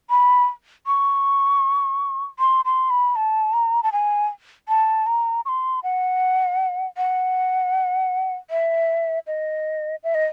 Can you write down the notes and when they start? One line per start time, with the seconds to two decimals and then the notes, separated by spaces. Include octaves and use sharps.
0.10 B5
0.87 C#6
2.39 C6
2.65 C6
2.90 B5
3.16 A5
3.53 A#5
3.83 A5
3.92 G#5
4.68 A5
5.06 A#5
5.45 C#6
5.49 C6
5.83 F#5
6.97 F#5
8.50 E5
9.27 D#5
10.03 E5
10.15 D#5